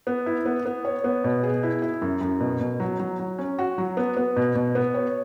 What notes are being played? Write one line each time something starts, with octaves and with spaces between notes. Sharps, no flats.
B3
E4
B3
B3
C#5
B3
B2
G#4
E4
E4
F#2
F#2
B2
B2
F#3
F#3
F#3
C#4
F#4
F#3
B3
B3
B2
B2
B3
C#5